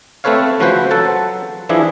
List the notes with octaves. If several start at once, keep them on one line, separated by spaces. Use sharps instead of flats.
A3 C4 A4 B4 C#5 F5
C#3 F3 A3 F#4 B4 C5
F#3 A4 F#5 A5
E3 F3 D4 E4 G#4